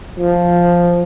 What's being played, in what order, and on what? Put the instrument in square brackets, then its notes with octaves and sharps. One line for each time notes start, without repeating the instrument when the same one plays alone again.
[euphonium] F3